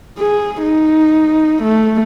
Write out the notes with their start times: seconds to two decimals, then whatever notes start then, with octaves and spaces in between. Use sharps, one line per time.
0.18 G#4
0.63 D#4
1.63 A3